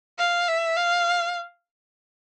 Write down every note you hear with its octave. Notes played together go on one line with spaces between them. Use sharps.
F5
E5
F5